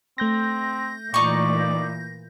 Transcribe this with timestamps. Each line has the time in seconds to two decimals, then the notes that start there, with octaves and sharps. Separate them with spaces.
0.18 A3 C4 G6 A#6
1.14 A#2 E3 D#4 D5 C#6